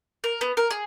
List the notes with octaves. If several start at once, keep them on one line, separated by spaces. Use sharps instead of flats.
A#4
B3
A#4
G#4